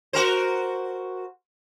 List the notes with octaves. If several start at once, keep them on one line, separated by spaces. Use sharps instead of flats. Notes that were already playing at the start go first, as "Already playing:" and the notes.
F#4 A#4 C5